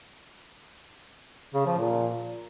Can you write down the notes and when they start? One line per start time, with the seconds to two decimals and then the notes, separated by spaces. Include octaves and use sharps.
1.55 C#3
1.66 F3
1.78 A#2